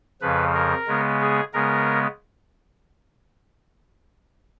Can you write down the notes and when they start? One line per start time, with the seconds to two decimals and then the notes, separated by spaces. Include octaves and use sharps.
0.21 F2 C#3 F3 B4
0.54 A#4
0.88 C#3 G#3 B3
1.21 G#4
1.53 C#3 G#3 B3 A#4